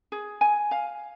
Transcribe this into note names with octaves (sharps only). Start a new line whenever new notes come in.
G#4
G#5
F5